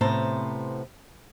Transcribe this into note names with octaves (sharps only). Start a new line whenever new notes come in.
A2 C3 B3 C5 A5 A#5